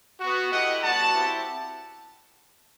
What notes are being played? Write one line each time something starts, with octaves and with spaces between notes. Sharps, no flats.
B3 F#4
A3 E4 G4 D#5 F#5
G3 B3 F#4 F#5 A5
C4 E4 G4